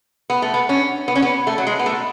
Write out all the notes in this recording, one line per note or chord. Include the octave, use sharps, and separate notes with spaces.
B3
A3
B3
C#4
B3
C#4
B3
A3
F#3
G#3
B3
A3